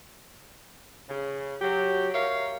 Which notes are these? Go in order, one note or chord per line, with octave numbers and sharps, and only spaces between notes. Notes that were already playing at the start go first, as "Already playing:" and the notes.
C#3
F#3 G4
A#4 C#5 E5 F5